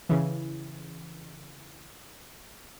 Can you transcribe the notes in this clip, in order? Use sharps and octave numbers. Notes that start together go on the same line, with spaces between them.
C#3 E3